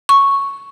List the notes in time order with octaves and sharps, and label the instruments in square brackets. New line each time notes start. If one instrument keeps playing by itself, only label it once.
[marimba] C#6